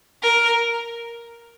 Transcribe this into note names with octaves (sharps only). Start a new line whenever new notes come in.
A#4